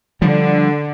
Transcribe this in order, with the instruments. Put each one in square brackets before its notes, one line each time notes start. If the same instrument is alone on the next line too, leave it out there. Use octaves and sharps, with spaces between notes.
[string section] D3 [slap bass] F3 G3